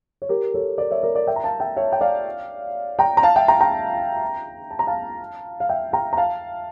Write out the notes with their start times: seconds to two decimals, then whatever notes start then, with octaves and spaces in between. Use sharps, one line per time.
0.22 C#5
0.29 G4 A#4
0.54 A4 C#5
0.78 A#4 D5
0.91 C#5 E5
1.03 A#4 D5
1.15 A#4 D5
1.27 E5 G5
1.36 A#5
1.44 F5 A5
1.60 E5 G5
1.77 C#5 E5
1.92 G5
2.01 D5 F5
2.99 G5 A#5
3.17 A#5
3.23 F5 A5
3.36 E5 G5
3.48 G5 A#5
3.61 G5 A#5
4.71 A5
4.79 A#5
4.87 F5 A5
5.60 F5
5.69 E5 G5
5.93 G5 A#5
6.13 A#5
6.17 F5 A5